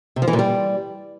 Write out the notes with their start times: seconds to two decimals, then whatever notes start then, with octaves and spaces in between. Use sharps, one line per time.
0.16 C3
0.22 F3
0.28 E3
0.33 A#2
0.39 G3